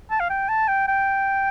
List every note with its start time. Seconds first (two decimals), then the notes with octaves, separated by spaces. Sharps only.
0.11 A5
0.20 F5
0.30 G5
0.49 A5
0.68 G5
0.88 G5